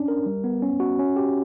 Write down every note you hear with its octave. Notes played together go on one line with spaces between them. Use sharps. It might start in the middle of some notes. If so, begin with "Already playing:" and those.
Already playing: C#4 D4
A#4
G3
B3
C#4
F#4
C#4
G4